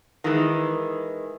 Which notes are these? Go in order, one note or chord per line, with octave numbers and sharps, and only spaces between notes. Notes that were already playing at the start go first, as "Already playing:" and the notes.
D#3 E3 G#3